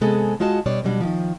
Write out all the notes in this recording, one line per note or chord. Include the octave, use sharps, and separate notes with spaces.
C3 G#3 B3 G#4 A4
G#3 F4 F#4 D#5 A5
B2 G3 D4 C#5 D5
B2 F#3 G3 D4
D#3 F3